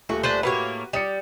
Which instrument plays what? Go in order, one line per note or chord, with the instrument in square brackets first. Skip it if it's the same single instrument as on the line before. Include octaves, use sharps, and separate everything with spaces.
[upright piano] D#1 A3 [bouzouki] F#4
[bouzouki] D4 B4 C5
[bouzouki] A2 A#3 C#5 [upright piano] F#4 G4 B4
[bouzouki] G3 [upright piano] D5 D#6 C#7